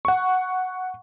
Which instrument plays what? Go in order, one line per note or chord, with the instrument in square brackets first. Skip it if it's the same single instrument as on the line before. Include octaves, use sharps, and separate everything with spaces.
[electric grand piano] F#5 C#6